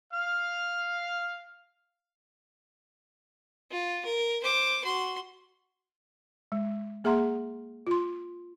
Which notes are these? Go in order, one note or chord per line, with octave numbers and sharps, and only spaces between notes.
F5 F6
F4
A#4
C5 D6
F#4 C6
G#3
A#3 G#4 E5 F#5 A#5 C6
F4 C6